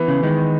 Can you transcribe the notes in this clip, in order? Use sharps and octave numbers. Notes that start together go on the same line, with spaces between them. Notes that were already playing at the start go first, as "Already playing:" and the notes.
Already playing: E3 B3
C#3
D#3 G#3